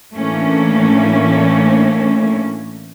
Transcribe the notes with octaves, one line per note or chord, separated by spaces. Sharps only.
A2 E3 A3 A#3 C#4 D4